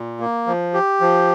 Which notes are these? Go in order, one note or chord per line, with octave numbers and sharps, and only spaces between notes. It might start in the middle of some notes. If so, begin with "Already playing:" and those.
Already playing: A#2
A#3
F3
G4
F3